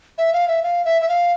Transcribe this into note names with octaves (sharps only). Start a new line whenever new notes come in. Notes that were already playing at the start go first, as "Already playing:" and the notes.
E5
F5
E5
F5
E5
E5
F5